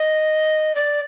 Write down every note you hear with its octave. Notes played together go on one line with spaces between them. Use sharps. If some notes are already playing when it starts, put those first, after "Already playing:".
Already playing: D#5
D5